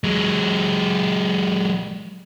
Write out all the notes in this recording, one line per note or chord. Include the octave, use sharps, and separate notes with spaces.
F#3 G#3